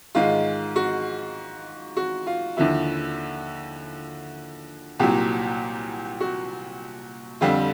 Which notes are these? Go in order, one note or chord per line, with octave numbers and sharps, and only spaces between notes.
G#2 D#3 G#3 F4
F#4
F#4
F4
D#2 D3 F3 E4
C2 A#2 F#3 G4
F#4
F2 D3 G3 C4 F4